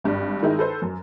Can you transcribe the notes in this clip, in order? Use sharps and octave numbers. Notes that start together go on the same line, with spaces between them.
G#1 G2 D4
D#3 G#3 D#4 E4
A4 B4 C5
F#2